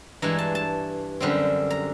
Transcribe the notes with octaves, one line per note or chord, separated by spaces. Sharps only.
G2 E3 G#3 A#5
A5
A5
F#2 D3 G3 C4
A#5